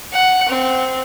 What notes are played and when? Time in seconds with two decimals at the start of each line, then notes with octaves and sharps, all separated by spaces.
0.12 F#5
0.48 C4